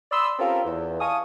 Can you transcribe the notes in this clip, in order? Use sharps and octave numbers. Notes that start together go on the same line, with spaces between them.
D5 B5 C6 D#6 E6
C4 C#4 F4 G4 A4 A#4
E2
F5 G#5 A5 C#6 D#6